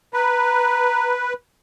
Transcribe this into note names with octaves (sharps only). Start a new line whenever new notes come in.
B4 A#5